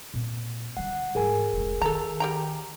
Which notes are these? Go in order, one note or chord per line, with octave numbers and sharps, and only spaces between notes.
A#2 C4
D3 G3 F#5
G#2 E3 G#4 A#4 G#5
F1 C#2
D#3 A4 A#5
G3 G5 A#5